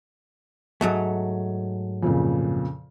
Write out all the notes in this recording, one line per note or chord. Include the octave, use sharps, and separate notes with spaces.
G#2 F#3 A3
F2 A#2 C#3